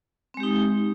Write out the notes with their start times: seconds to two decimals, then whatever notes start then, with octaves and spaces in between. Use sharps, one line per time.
0.34 C4
0.37 G#3
0.40 G4
0.43 D#4